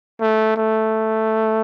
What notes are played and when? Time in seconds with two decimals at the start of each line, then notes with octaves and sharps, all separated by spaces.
0.21 A3
0.56 A3